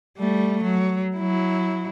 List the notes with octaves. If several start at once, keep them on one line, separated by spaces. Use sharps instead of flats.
G3 A3
F#3
F#3 E4